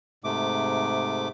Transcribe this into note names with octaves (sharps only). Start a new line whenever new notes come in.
G#2 C3 A3 D6